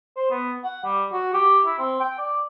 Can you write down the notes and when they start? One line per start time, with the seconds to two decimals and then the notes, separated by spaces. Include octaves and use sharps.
0.16 C5
0.30 B3
0.64 F#5
0.84 G3
1.13 F#4
1.34 G4
1.65 E4
1.79 C4
2.00 G5
2.18 D5